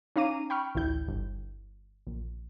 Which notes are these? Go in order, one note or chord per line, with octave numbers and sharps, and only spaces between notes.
C#4 D#4 F5 A#5 D6 D#7
G5 B5 C#6 F6
A1 D2 E4 G6
G1
A#1